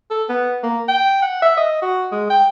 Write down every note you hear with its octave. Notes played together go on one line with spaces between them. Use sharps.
A4
B3
A#3
G5
F#5
E5
D#5
F#4
G#3
G5